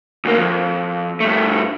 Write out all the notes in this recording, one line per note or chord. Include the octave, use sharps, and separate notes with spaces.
D2 A#3
F2
G2 A3